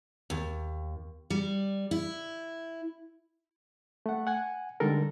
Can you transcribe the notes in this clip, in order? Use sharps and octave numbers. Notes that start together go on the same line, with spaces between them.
D#2
G3
E4
A3 F#5
F#5 G#5
D3 G3 G#3 D#4 A4 A#4